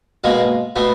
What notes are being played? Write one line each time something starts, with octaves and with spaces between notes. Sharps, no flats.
B2 G#3 A#3
B2 A3 B3